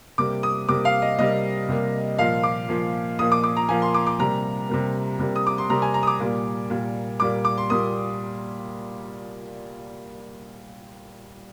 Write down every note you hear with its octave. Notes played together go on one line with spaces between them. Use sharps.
C3 G3 A#3 D6
D#6
C3 G3 A#3 D6
F5
D#5
C3 G3 A#3 D#5
C3 G3 A#3
A#2 F3 A#3 F5
D6
A#2 F3 A#3
A#2 F3 A#3 D#6
D6
D6
A#5
A#2 F3 A#3 G#5
C6
D6
D6
C3 G3 A#3 A#5
C3 G3 A#3
C3 G3 A#3
D#6
D6
C6
C3 G3 A#3 A#5
G#5
A#5
D#6
D6
A#2 G3 A#3
A#2 G3 A#3
A#2 G3 A#3 D6
D6
C6
A#2 G3 A#3 D#6